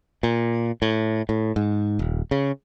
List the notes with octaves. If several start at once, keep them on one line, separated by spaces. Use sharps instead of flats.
A#2
A2
A2
G#2
D#1
C#3